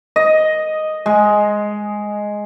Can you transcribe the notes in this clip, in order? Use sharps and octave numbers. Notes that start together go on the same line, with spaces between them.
D#5
G#3